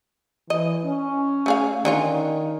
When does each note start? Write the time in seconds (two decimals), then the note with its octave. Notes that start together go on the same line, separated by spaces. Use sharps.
0.50 E3 D#5
0.86 C#4
1.46 A3 G#4 F5
1.85 D3 D#3 C#4 F4